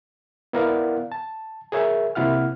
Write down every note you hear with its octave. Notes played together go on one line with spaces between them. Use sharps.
B3 E4 A#4 D5 F5 F#5
A5
G#4 A#4 C#5 E5
C3 A#3 E4 F#5 F6